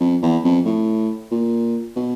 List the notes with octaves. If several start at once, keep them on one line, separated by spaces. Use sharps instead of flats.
F2
E2
F2
A2
A#2
B2